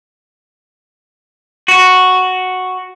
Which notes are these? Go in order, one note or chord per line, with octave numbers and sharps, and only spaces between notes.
F#4